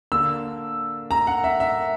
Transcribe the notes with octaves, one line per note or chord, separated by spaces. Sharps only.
D3 A#3 D4 E6
A#5
F#5
E5
E5